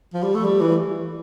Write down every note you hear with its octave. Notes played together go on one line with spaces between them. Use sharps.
F3
G3
A3
G3
E3